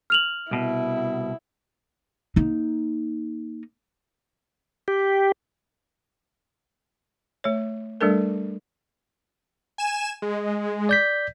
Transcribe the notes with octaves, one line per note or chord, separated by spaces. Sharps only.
F6 F7 F#7
C2 B2 E4
A#3 D#4
G4
A3 C#5
G3 A3 D4 A4 A#4
G#5 E7
G#3
D5 G6 B6